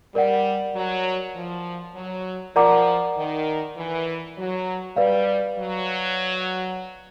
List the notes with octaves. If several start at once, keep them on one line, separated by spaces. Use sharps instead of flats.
G3 A#4 D5 F#5
F#3
F3
F#3
F3 A#4 D5 F#5 A#5 D6
D#3
E3
F#3
G3 B4 D5 F5
F#3